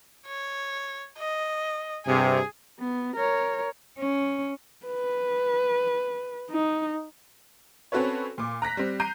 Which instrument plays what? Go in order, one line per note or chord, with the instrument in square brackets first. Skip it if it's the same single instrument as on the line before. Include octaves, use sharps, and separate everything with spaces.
[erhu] C#5
D#5
[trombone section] G2 C3 [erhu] G#4
[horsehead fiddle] B3
A#4 C#5
[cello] C#4
[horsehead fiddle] B4
D#4
[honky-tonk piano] C4 C#4 F#4 A4 B4 C#5
A#2 D6
A#5 F#6 A#6 B6
G3 C4
A#5 G6 C7 D#7